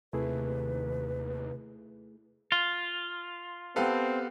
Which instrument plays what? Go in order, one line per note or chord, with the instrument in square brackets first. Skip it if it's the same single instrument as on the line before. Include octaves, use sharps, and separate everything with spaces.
[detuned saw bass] D#2 [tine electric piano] C3 [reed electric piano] A3 E4 G#4 [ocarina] B4
[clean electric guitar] F4
[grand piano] B3 G4 [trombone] C4 [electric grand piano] A4 B4 F5